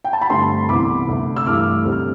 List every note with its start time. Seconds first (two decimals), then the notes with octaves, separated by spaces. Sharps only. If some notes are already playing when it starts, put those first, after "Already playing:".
0.04 G5
0.13 A5
0.21 B5
0.30 G2 D3 A3 C4 A5 C6
0.69 C2 C3 E3 B3 B5 D6
1.08 D2 C3 G3
1.36 E6
1.46 G2 E3 A3 D6 F6
1.85 D2 C3 G3 C4
1.92 F6